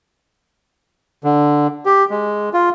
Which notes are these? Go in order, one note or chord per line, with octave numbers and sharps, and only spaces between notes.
D3
G4
G#3
F4